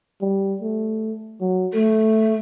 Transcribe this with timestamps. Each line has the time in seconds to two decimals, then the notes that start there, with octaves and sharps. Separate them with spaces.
0.21 G3
0.62 A3
1.41 F#3
1.73 A3 A4